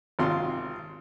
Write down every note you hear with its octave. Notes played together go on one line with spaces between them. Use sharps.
G#1 C3 F4 C6